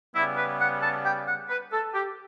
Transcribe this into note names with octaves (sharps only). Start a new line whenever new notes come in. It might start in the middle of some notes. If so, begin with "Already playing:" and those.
C#3 G3 B3 E4
B4
F#5
A5
G5
F#5
B4
A4
G4